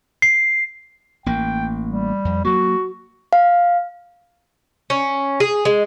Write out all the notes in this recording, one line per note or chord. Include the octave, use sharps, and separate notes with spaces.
C7
A1 A#3 G5
G3
F2
F#3 A#3 F#4
F5
C#4
G#4
G#3